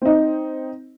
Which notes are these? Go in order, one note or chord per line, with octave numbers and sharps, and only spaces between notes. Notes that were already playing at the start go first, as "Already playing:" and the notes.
C4 D#4